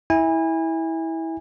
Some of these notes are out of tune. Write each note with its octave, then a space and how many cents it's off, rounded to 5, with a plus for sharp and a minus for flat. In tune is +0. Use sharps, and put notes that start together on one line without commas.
E4 -20 G#5 -30